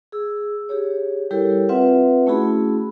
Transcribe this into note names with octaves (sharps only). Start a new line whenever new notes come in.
G#4 E6
G4 G#4 C#5
G3 E4 G4 A4 A#4 C#5
C4 F4 B4 E5 F#5
A3 C#4 E4 F#4 G#4 B5